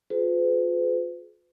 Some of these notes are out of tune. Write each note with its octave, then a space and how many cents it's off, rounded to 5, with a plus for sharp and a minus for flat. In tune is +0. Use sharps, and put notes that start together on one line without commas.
F4 +30 G#4 +35 B4 +45